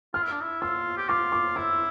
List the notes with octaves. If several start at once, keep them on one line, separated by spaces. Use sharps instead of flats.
F4 F6
E4
D4
E4
F4 E6
G4
F4 D6
D6
E4 E6